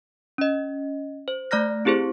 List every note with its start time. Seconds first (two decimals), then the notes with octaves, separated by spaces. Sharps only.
0.38 C#4 D#5
1.28 C5
1.51 A3 D5 A#5 F6 F#6 A#6
1.85 C4 E4 G4 G#4 C5